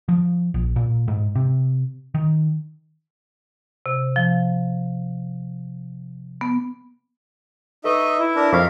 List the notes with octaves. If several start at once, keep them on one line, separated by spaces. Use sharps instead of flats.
F3
A#1
A#2
G#2
C3
D#3
C3
F3
B3
D#4 A4 B4 D#5 E5 C#6
E4
D4 A#4
F2 A#4 C5 F5 C#6 B6